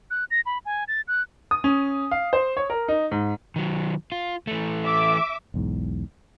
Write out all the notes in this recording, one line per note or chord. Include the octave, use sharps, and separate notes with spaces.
F#6
A#6
B5
G#5
A6
F#6
D#6
C#4
F5
C5
C#5
A#4
D#4
G#2
D#3 F#3
F4
E3 A3
E5 D6
B1 E2 G#2